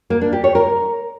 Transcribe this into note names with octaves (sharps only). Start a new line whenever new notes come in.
A#3
D4
G4
C#5
A#4